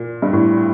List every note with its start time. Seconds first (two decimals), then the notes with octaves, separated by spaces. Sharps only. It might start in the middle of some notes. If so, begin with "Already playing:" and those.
Already playing: A#2
0.22 G2
0.33 A2